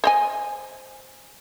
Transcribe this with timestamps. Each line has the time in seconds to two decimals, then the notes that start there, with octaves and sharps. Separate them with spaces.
0.04 C5 D#5 G#5